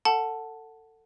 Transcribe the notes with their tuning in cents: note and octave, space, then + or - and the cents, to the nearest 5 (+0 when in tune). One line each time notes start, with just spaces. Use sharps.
A4 +25 F#5 +0 A5 +0